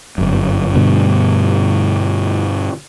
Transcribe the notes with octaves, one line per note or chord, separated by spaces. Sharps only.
G1 F#2
G2 B2 D3